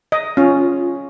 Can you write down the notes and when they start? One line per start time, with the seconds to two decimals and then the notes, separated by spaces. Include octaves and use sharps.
0.12 D#5
0.37 C#4 F4